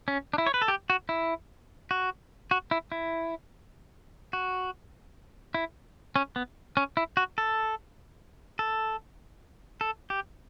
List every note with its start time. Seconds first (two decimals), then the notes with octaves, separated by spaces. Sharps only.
0.08 C#4
0.34 D4
0.38 E4
0.46 C#5
0.54 B4
0.62 A4
0.68 G4
0.90 F#4
1.09 E4
1.91 F#4
2.51 F#4
2.71 E4
2.92 E4
4.33 F#4
5.54 E4
6.16 C#4
6.36 B3
6.77 C#4
6.97 E4
7.17 F#4
7.38 A4
8.59 A4
9.81 A4
10.10 G4